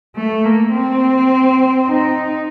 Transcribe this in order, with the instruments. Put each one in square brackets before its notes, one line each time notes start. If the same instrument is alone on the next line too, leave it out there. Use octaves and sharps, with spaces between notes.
[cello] A3
A#3
C4
D#4